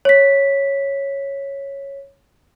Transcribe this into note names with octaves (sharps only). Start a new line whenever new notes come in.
C#5 B6